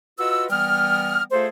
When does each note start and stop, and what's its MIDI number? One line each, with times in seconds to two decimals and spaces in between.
0.19 0.46 65
0.19 0.46 66
0.19 0.46 71
0.19 0.46 75
0.19 0.46 88
0.50 1.23 52
0.50 1.23 55
0.50 1.23 59
0.50 1.23 79
0.50 1.23 87
0.50 1.23 89
1.32 1.48 57
1.32 1.48 65
1.32 1.48 68
1.32 1.48 69
1.32 1.48 72